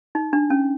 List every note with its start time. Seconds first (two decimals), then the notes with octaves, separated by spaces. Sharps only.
0.15 D#4
0.33 D4
0.50 C#4